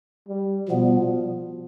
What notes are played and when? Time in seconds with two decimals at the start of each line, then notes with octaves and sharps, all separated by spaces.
0.28 G3
0.68 B2 F3 G3 B3